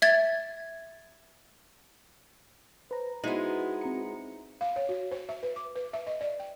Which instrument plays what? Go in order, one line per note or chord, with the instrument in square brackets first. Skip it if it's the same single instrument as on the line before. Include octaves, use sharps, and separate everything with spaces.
[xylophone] E5 G#6 A6
[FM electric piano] B4 A#5 [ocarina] C5
[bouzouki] G#3 B3 [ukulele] D#4 E4 C5 [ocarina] F#4
[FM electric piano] C4 A#5 C#7
[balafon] F5
C#5
F#4
C5
E5
B4
D6
B4
E5
D#5
D5
G5